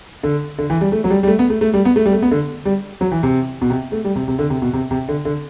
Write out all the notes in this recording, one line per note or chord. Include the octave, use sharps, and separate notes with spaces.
D3
D3
E3
G3
A3
F#3
G3
G3
A3
B3
A3
A3
G3
B3
A3
G3
A3
B3
D3
G3
F#3
E3
C3
B2
C3
A3
G3
C3
C3
D3
C3
B2
C3
C3
D3
D3